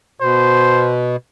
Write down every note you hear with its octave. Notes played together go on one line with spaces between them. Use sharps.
B2 C5